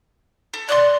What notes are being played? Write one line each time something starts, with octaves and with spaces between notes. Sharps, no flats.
A4
D5 C6 D6 F#6